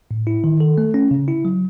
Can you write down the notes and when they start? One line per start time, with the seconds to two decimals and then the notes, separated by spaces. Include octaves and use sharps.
0.11 A2
0.27 E4
0.44 D#3
0.60 A4
0.78 A3
0.94 C#4
1.11 C#3
1.28 E4
1.45 F#3